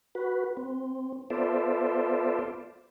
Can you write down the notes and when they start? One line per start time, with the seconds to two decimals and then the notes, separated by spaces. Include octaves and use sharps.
0.15 F#4 B4
0.57 C4
1.30 B3 F4 A4 C5 D5 E5